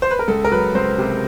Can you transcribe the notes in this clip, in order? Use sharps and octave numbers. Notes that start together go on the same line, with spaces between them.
C5
B4
A#4
C#2 A4
A#4
F#3 B4
C#2 C5
C3